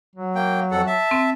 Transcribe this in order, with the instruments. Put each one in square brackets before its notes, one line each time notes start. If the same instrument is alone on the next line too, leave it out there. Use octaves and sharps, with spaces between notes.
[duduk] F#3
[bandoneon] A#3 G5
F2 A4 F#5
E5 A5
[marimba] C4